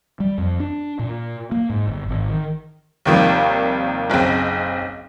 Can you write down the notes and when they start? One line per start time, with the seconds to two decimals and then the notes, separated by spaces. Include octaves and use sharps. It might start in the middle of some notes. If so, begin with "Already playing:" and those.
0.20 G3
0.38 F2
0.60 D4
0.99 A#2
1.52 A#3
1.70 G#2
1.88 G1
2.09 G#1
2.29 D#3
3.05 D#2 C3 D#3 F3 G3 A#3
4.10 F#1 B1 C#3 C4